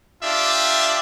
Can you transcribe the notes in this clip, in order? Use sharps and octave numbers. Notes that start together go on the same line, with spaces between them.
D4 F4 G4 D5 E5